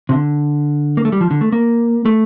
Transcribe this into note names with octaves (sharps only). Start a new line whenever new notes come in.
C3
D3
A#3
A3
G3
F3
D3
A3
A#3
A3